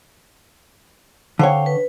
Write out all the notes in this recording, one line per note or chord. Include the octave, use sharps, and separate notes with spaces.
D3 C5 C#5 F5 G5
B4